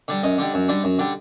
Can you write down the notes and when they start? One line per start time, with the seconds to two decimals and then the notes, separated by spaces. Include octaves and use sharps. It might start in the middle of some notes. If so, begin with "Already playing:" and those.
0.08 D3 G3
0.23 F#2 D#5
0.38 D3 G3
0.54 F#2
0.68 D3 G3
0.84 F#2
0.99 D3 G3